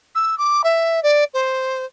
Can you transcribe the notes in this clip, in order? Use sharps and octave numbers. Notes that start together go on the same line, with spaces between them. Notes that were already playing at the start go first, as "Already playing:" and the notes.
E6
D6
E5
D5
C5